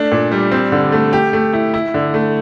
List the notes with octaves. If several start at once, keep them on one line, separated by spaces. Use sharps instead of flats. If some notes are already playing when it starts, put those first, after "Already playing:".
Already playing: A3 D4
A#2
G3
C4
D3
A3
G4
A3
E4
E4
D3
A3